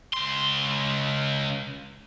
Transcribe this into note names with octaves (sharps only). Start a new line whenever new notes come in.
C#2 C6